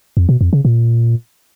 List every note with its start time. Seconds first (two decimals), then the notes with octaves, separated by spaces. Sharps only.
0.17 F2
0.29 B2
0.41 F2
0.53 C#3
0.65 A#2